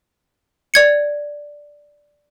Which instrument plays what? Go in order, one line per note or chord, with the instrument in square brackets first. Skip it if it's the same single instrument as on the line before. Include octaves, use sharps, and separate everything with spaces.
[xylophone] D5 G#6 C#7